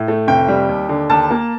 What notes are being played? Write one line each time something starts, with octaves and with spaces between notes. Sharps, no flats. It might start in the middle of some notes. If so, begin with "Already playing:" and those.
Already playing: A2
A3
F1 G5
G3
D#2
D3
D#2 A5
A#3